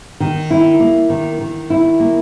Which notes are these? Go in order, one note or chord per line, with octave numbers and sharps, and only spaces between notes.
D#3
E4
A#3
D#3
D#3
E4
A#3